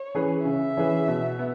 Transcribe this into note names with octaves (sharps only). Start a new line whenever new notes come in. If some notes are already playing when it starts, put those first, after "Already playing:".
Already playing: C#5
E3 C#4 G#4 B4
C#3 E5
E3 C#4 G#4 B4
B2
B3